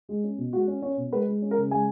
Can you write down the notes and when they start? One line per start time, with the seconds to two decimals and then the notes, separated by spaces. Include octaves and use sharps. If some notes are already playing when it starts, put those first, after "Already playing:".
0.09 G#3
0.24 C#4
0.38 B2
0.53 G#3 F#4
0.67 C#4
0.82 C#4 C#5
0.97 B2
1.12 G#3 B4
1.27 G#3
1.42 C#4
1.51 A#4
1.57 C#3
1.71 G#3 G#5